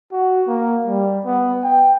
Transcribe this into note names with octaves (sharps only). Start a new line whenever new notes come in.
F#4
A#3
G3
B3
G5